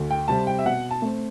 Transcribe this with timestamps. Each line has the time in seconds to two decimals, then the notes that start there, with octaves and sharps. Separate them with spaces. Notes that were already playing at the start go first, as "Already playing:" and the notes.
Already playing: D2
0.10 G5
0.28 C3 G3 C4 A5
0.47 G5
0.59 E5
0.65 B2 F#5
0.91 A5
1.02 A3 C4